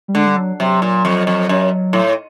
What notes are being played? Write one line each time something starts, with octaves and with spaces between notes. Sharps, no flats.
G3
D3 G#3
G3
F#3
C3 F#3
A#2
F2
F2
F#2
A2